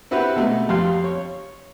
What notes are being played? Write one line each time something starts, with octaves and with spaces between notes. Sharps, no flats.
C4 E4 F#4 G4 B4
B2 F#3 G#3 A3
F2 G3 F5 C6
C#5